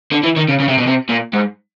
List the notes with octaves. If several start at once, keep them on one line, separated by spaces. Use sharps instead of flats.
D3
E3
D#3
C#3
C#3
C3
B2
C3
A#2
G#2